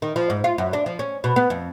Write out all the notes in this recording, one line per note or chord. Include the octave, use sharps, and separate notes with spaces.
D#3
F3
G#2
F4
F#2
D4
F3
C#4
B2
B3
F2